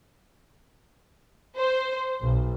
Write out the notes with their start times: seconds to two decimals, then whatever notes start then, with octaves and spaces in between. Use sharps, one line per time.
1.57 C5
2.21 B1